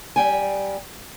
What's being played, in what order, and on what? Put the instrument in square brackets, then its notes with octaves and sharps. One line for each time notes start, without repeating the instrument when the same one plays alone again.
[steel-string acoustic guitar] G3 G5 G#5